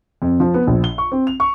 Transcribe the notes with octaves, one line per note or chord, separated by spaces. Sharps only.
F2
F3
B3
A#1
G7
C#6
C4
F7
C#6